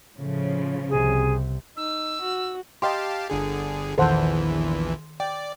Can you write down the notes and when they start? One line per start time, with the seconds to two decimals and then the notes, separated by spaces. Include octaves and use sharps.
0.18 A2 C#3 F3
0.89 C2 C3 G#4
1.77 D#4 E6
2.21 F#4
2.82 G4 D#5 F5 G5 A5 C6
3.30 G1 D3 G#4
3.98 A#1 E2 D#3 E3 A4 C5 F#5 C6
5.20 D5 G5